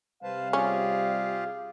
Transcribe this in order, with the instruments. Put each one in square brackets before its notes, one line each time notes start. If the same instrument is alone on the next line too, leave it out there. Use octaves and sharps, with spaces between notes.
[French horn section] C3 G3 [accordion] B4 C5 A5 [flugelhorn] F5
[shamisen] C#4 [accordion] F4 G4 G#4